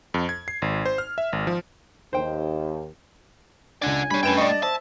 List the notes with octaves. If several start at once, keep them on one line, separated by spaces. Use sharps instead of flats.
F2
G#6
C7
G#1
C5
F6
E5
G#1
F3
D#2 C5 G5
C#2 D4 D5 F#5 G#5
G3 D4 C#5 B5 D#7
F#2 A3 B4 G5 E7
D5 D#5 C#6
A5
C5 E5 A5